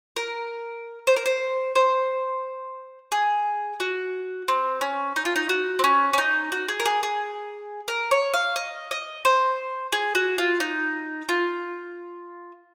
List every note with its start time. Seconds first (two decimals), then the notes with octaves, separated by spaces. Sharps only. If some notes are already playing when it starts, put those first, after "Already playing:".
0.16 A#4
1.07 C5
1.16 A#4
1.26 C5
1.75 C5
3.12 G#4
3.80 F#4
4.48 C4
4.81 C#4
5.16 D#4
5.25 F4
5.36 D#4
5.49 F#4
5.79 C4
5.84 C#4
6.13 C#4
6.18 D#4
6.52 F#4
6.68 G#4
6.80 A#4
6.85 G#4
7.03 G#4
7.88 A#4
8.11 C#5
8.34 F5
8.56 D#5
8.91 D#5
9.25 C5
9.92 G#4
10.15 F#4
10.38 F4
10.60 D#4
11.29 F4